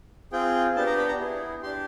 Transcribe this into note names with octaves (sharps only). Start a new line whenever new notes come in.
C4 F4 G#4 G5
B3 D4 G4 A5
A#5
B5
A#5
B3 E4 G#4
D4 G4 C6